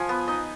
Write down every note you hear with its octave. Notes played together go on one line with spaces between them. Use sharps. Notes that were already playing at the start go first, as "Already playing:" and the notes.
Already playing: F3 G#5
B3
D#4 D#5